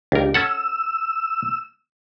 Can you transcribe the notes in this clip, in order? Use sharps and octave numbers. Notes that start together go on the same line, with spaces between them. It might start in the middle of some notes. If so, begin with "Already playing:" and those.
C#2 D4 G4 A#4
C#4 A4 F#5 E6